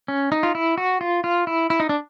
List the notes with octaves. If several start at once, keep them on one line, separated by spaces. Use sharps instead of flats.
C#4
D#4
F4
E4
F#4
F4
F4
E4
E4
D#4
D4